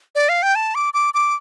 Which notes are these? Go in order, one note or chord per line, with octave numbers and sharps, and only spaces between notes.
D5
F5
G5
A5
D6
D6
D6